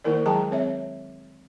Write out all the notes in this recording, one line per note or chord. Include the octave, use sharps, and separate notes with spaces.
D#3 A#3 E4 A#4 D5
F#3 G#3 G#4 G5 A5 A#5
C4 C#5 E5